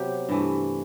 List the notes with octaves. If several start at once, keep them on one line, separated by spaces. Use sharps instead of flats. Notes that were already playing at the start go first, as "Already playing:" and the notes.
Already playing: C3 F#3 B3 G4
G2 E3 A3